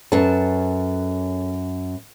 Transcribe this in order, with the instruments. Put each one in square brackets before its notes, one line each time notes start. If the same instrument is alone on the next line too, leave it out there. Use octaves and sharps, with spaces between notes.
[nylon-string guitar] F#2 A5 [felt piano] C#4 A4 B4